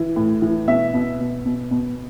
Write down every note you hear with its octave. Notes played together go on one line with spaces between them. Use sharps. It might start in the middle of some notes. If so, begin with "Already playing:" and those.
Already playing: E3
A2
E3
B2 E5
B2
B2
B2
B2